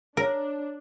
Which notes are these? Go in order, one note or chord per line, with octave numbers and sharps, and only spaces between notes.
D4 A#4 C#5 A#5